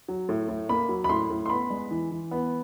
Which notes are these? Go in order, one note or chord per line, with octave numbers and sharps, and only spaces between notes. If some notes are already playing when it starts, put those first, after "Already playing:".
F#3
A2
A2
A#3 B5
F#3
B5
A2 C6
A2
C6
B3 B5
G#3
E3
E3
B3